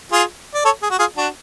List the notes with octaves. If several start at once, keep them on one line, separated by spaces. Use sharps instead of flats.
F4 G#4
D5
A4 C#5
G#4
F#4
F4 G#4
D4 F#4